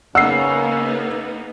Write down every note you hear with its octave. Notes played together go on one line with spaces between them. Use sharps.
C#3 A#3 B3 D#4 F#5 E6 C7